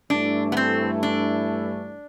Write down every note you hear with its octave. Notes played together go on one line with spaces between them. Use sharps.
G2 E3 A3 D4 E4
B3
C4
D4